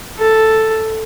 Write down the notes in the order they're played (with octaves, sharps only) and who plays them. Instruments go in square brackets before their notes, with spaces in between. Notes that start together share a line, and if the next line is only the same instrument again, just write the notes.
[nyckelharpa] A4